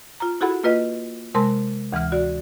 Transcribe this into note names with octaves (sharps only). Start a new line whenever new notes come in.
F4 A#5
E4 F#4 G#4 A4 F#5 B5
A#3 F4 B4 D#5
C3 G#3 A#4 A5 C6
D2 E3 F#5 F6
F#4 D5